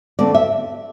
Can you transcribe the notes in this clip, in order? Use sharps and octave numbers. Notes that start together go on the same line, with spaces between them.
D3 A3 C4 D5
E5